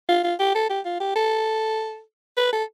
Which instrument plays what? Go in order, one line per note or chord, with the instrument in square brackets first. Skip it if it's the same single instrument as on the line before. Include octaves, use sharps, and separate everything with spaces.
[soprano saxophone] F4
F4
G4
A4
G4
F4
G4
A4
B4
A4